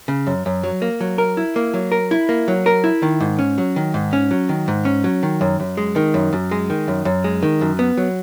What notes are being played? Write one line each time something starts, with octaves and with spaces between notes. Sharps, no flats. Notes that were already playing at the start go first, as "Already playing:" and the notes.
C#3
F#2
F#2
F#3
A#3
F#3
A#4
E4
A#3
F#3
A#4
E4
A#3
F#3
A#4
E4
D#3
G#2
C#4
F#3
D#3
G#2
C#4
F#3
D#3
G#2
C#4
F#3
D#3
F#2
F#2
G#3
D#3
F#2
F#2
G#3
D#3
F#2
F#2
G#3
D#3
F#2
B3
F#3